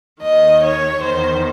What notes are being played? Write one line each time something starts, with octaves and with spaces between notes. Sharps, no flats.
D#2 D#3 D#5
C#5
E2 D#3 C5